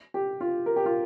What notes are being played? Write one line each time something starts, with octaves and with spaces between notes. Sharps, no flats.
G4
F4
A#4
G4
F4